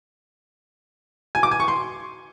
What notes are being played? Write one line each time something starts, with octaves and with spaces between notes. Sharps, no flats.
G#5
D6
G#5
C#6
C6